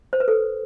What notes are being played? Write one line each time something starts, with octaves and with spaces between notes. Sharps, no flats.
C5
B4
A4